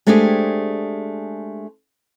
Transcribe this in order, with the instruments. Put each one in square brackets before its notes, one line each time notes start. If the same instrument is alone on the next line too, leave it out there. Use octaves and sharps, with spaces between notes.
[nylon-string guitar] G#3 A3 C4 D4 G4 G#4